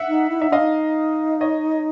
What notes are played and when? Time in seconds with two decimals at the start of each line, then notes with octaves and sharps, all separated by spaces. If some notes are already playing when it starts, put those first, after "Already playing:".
Already playing: E5 F#5
0.08 D#4
0.30 E4
0.40 D#4 E5
0.50 D4 D#5 F5
0.59 D#4
1.41 C#5 D#5